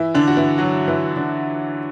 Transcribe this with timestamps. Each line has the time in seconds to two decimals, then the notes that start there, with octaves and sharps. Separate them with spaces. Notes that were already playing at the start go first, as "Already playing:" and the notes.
Already playing: E3 E4
0.14 D3 D4
0.28 F#4
0.37 E3 E4
0.58 F#3 F#4
0.88 E3 E4
1.16 D3 D4